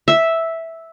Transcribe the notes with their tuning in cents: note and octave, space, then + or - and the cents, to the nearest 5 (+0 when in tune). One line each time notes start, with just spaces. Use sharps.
E5 -5